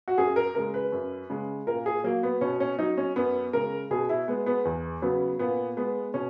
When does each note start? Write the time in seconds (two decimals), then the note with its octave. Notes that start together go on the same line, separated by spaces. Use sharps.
0.08 F#4
0.18 F#2 G#4
0.36 A#4
0.55 C#3 G#3 A#4
0.74 B4
0.92 F#2
1.30 C#3 G#3
1.67 A#2 A#4
1.86 G#4
2.04 F#3 A#3
2.23 B3
2.41 B2 C#4
2.60 C#4
2.79 F#3 D#4
2.98 C#4
3.16 F#2 B3
3.53 C#3 G#3 A#4
3.90 B2 G#4
4.09 E4
4.28 G#3 B3
4.46 B3
4.65 E2
5.02 C#3 F#3 B3
5.39 A#2 B3
5.77 G#3 B3
6.14 B2 C#4